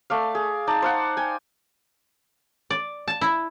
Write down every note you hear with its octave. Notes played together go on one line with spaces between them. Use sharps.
A3 D5 F5
G#4
D#4 D5 A5
C5 F5 F#5
G5 G#5
D5
A5
E4